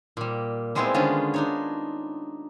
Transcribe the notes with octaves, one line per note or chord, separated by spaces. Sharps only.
A#2 G3
G3 G#3 B3 C4 E4 G#4
D3 D#3 G#3 B3 C#4 F4
D4 D#4 C#5